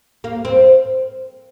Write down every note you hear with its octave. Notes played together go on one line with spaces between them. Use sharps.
A#3
C4